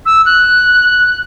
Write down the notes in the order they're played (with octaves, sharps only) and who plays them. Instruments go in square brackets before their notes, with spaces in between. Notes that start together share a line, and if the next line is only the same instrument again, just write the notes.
[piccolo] E6
F#6